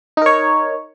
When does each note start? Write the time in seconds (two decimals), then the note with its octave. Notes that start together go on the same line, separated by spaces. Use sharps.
0.17 D#4
0.22 A#4
0.26 C#5